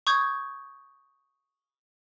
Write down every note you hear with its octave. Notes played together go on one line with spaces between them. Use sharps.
C#6 D#6 G6 G#6